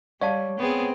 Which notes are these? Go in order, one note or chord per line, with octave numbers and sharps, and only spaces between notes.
G3 C#5 D5 F5 A5
B3 C4 G#4